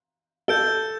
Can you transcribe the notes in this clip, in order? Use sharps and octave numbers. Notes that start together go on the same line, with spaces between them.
A4 G6 D7 G7